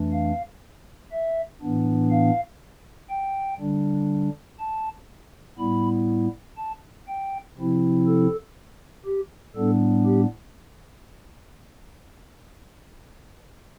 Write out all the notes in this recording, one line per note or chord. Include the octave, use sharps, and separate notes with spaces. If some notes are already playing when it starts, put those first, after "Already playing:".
Already playing: F2 E3 A3 D4
F5
E5
A2 E3 B3 D4
F5
G5
D3 G3 D4
A5
A2 G3 B3 E4 B5
A5
G5
C3 F3 C4 E4
A4
G4
A2 G3 B3 D4 A4
G4